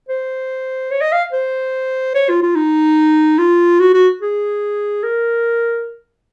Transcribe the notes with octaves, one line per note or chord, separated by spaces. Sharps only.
C5
C#5
D#5
F5
C5
C#5
F4
F4
D#4
F4
F#4
F#4
G#4
A#4